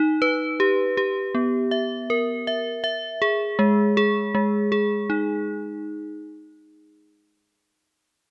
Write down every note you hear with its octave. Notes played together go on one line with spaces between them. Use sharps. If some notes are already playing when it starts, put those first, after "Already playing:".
Already playing: D#4
B4
G4
G4
B3
E5
A#4
E5
E5
G#4
G#3
G#4
G#3
G#4
D#4